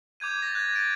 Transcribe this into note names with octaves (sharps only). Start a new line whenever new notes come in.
D6 G6 G#6 D#7
A6 A#6
F#6 G#6
G#6 A6 D7